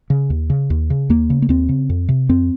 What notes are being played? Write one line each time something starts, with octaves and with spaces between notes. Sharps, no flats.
C#3
D#2
C#3
D#2
C#3
D#2 A#3
C#3
A#3
D#2 C4
C#3
F2
C3
F2 C4